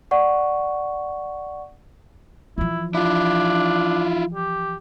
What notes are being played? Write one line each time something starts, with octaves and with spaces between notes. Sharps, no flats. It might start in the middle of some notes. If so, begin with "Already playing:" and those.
D5 F#5 C#6
E3 F3 E4
D4 E4 F4
G4